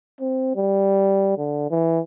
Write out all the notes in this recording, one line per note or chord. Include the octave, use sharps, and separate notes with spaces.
C4
G3
D3
E3